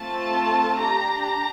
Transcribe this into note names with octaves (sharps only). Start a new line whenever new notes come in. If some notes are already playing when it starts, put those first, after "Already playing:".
Already playing: A3 C4 F4 A4 A5
D4 G4 A#5
A#5